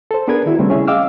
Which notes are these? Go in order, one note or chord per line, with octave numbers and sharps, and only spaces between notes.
A4 C5
B3 D4 G#4 A#4 B4 G#6
D#3 E4 F#4
C#3 G3 A3 C4 D4
C#4 E4 G#4 E5
D#5 F5 G5 D6 E6 F6